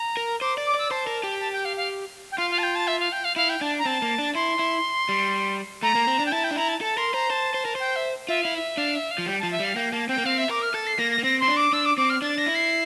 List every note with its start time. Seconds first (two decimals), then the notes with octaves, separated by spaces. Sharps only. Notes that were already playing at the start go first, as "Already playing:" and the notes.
Already playing: A#5
0.17 A#4
0.41 C5 D6
0.58 D5
0.66 D6
0.74 D5 E6
0.91 C5 A5
1.07 A#4
1.23 G4
1.39 A5
1.52 G5
1.65 F5
1.77 F5
2.31 G5
2.38 F4 F5
2.50 F5
2.58 A5
2.63 G5
2.75 A5
2.87 E5
3.00 F5
3.12 G5
3.24 F5
3.36 E4 F5
3.49 G5
3.61 D4 A5
3.78 A#5
3.85 C4 A5
4.02 A#3
4.19 D4
4.35 E4 C6
4.59 E4
5.09 G3
5.82 A3 A#5
5.95 A#3
6.07 C4
6.19 D4
6.26 G5
6.32 E4 A5
6.44 G5
6.51 D4
6.56 E4 A#5
6.68 A5
6.81 A4 A5
6.97 A#4 C6
7.14 C5 A#5
7.30 C5 A5
7.54 C5
7.65 A#4
7.75 C5 G5
7.96 E5
8.28 F4 E5
8.41 E4 F5
8.54 E5
8.77 D4 F5
8.94 E5
9.11 F5
9.18 F3
9.26 G3 G5
9.39 F3 A5
9.52 E5
9.60 G3 F5
9.76 A#3 G5
9.92 A#3 A5
10.08 C4 G5
10.18 A#3
10.25 C4 F5
10.38 E5
10.49 A#4 D6
10.62 F6
10.74 A4 A6
10.87 C7
10.99 A#3 A#6
11.11 A#6
11.18 A#3
11.23 C4 A#6
11.40 C4 C6
11.48 D4
11.56 D6
11.73 D4 E6
11.85 D6
11.97 C4 D6
12.09 F6
12.22 D4 A6
12.38 D4 A#6
12.46 E4
12.55 C7